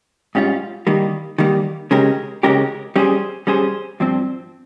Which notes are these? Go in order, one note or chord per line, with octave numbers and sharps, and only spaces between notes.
G#2 G3 C#4 F4
D#3 G3 A#3
D#3 G3 A#3
C#3 G#3 C#4 G4 A#4
C#3 G#3 C#4 G4 A#4
G3 C#4 G#4 C5
G3 C#4 G#4 C5
G2 F3 C4